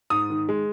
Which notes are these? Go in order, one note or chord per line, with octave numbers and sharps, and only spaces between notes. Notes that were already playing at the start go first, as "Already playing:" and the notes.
G#2 D#6
D#3
G#3